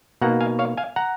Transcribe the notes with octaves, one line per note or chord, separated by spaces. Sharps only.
B2 A#3 D#4 F#5 A#5
F5 G#5
C#5 F5
F5 G#5
F#5 A#5